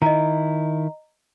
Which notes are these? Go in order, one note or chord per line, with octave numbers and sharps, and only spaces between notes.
D#3 E4 D#5 A#5